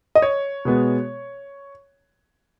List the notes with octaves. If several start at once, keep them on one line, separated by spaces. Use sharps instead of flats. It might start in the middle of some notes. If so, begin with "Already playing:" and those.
D#5
C#5
B2 G#3 B3